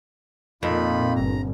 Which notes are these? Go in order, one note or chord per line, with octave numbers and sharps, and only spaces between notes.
F2 A#2 D#4 F4 B5
G1 A#5